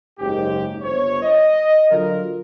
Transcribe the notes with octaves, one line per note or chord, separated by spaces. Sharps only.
F#1 G#2 G4
G1 C5 C#5
D#5
D3 F#3 F4 A#4